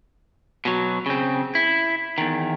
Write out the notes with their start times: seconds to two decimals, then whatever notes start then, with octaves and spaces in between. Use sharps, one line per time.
0.65 B2 F#3
1.06 C#3 C4
1.55 E4
2.18 E2 D#3